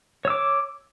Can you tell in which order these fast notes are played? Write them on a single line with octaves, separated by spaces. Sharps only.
C#5 E6 D6